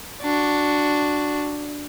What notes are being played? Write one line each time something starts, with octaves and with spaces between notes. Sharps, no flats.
D4 F#4